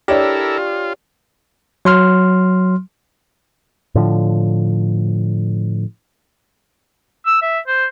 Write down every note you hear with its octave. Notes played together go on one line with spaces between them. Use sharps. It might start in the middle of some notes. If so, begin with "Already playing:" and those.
D4 E4 G4 A4 A#4 C#5 D5
F4
F#3 C6 F6
A2 D3 F3
E6
E5
C5